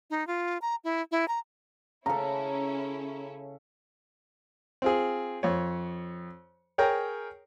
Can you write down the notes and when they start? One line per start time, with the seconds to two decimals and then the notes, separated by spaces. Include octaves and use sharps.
0.10 D#4
0.27 F4
0.62 A#5
0.84 E4
1.12 E4
1.28 A#5
2.06 C#3 C#4 E4 A4 A#5
4.82 C4 F4 G#4
5.43 F2 C#5
6.78 G#4 A#4 C#5 G5 A#5